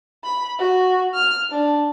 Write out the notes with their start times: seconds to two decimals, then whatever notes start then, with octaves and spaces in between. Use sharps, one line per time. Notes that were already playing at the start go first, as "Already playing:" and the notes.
0.24 B5
0.59 F#4
1.14 F6
1.52 D4